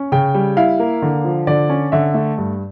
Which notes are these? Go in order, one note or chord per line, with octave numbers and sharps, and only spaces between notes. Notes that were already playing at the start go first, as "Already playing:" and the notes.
Already playing: C#4
C#3 G5
G3
E4 F5
A#3
D3
F3
D3 D5
C#4
D3 E5
A3
G2